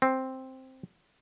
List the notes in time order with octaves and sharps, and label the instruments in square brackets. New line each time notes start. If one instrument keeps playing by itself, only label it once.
[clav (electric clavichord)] C4